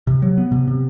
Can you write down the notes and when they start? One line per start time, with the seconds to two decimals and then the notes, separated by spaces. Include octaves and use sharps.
0.07 C3
0.22 F#3
0.37 B3
0.52 C3
0.68 C3